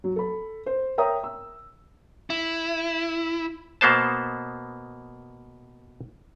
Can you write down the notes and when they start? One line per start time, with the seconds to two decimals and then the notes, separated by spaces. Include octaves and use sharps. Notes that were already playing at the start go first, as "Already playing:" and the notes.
0.04 F#3
0.16 A4 B5
0.66 C5
0.98 A#4 C#5 E5 G5 A#5 D#6
1.24 E6
2.30 E4
3.81 B2 A#3 B3 C5 A5